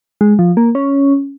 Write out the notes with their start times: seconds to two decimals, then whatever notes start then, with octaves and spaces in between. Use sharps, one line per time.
0.21 G#3
0.39 F3
0.57 A#3
0.75 C#4